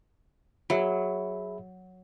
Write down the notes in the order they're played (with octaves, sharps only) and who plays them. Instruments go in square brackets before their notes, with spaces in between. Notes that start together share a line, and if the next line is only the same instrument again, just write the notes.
[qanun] F#3 [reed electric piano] G#4 E5 B5